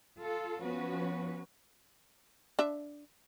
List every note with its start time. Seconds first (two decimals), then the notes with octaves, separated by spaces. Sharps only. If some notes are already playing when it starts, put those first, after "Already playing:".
0.19 F4 A4
0.61 F3 B3 C#4 F#4 B4
2.59 D4 E5